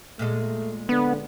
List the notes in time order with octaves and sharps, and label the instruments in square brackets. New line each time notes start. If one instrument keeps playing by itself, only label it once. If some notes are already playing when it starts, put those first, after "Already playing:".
[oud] A#2 G#3 A4 [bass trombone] A3
[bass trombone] D3 [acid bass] B3